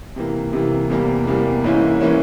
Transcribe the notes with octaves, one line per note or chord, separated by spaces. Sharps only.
C3 E3 A#3
C3 E3 A#3
E2 C3 G3 A#3
E2 C3 G3 A#3
G#2 E3 A#3 C#4 E4
E3 A#3 C#4 E4